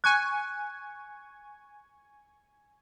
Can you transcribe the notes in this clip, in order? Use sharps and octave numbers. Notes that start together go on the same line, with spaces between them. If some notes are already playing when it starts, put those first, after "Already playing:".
G#5 C#6 F#6 G#6